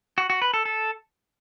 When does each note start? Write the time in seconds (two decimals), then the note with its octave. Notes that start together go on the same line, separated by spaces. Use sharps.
0.18 F#4
0.30 F#4
0.42 B4
0.54 A4
0.65 A4